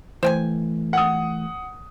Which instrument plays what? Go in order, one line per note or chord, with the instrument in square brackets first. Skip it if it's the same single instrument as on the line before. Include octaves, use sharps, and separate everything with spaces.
[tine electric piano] E3 A3 [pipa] C5 G5 G#5
[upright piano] F#5 D#6